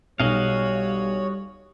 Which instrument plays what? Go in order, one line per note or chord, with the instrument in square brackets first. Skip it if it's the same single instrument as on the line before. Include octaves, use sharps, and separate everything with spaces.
[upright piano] B1 [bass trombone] G3 [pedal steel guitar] F#4 D#5 F5 [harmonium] C#5